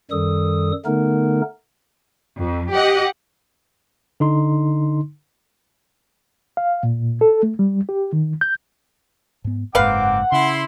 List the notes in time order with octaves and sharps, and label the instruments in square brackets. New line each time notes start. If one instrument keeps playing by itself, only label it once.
[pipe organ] F#2 D#3 G3 A4 D#6
D3 A3 B3 D#4 A#4
[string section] F2
G4 D#5 F#5
[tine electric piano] D3 D#4 C6
[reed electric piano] F5
A#2
A4
A3
G3
G4
D#3
G6
[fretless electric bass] G#2 B3
[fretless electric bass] F#1 G#2 [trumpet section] A#3 C4 D6 [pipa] B4 F5 [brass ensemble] F#5
[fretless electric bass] C#3 [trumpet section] E4 C6